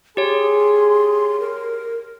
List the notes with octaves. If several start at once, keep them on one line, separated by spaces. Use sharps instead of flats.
G4 G#4 C#5 C6
A#4